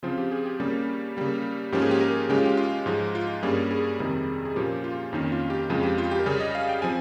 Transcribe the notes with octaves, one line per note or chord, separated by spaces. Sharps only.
C#3 F3 C4 F4
G4
G#4
G4
C#3 G3 A#3 C#4
C#3 G3 A#3
G#2 F3 A#3 C#4 G4
G#4
G4
A#4
C#3 G#3 C#4 G4
F4
G4
F4
G#2 F3 G#3
F4
G2 G3 A#3 C#4 G#4
G#4
F2 C3 D#3 G3
G#4
A#2 F3 A#3 C#4 G4
F4
F2 D#3 A#3 C#4 D#4
F4
G4
F2 C#3 F3 G#3 F4
G4
F4
G4
A#4
C#3 G3 C#4 G#4
D#5
F5
G5
F3 C4 G#5